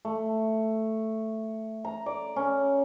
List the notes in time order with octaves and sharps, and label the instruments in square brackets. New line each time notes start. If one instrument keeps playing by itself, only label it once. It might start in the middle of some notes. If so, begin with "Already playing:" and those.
[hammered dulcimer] A3
A#5
D5
C#4